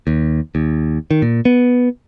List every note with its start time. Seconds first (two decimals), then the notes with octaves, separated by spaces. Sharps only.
0.07 D#2
0.55 D#2
1.11 D#3
1.22 A#2
1.45 B3